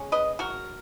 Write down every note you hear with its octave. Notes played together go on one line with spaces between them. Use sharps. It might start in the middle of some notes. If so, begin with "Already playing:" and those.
Already playing: G#3 C#4
B4 D#5
F#4 A#4